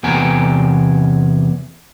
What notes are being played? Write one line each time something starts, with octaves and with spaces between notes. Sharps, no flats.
E2 C3 B3 G5 G#5 A#5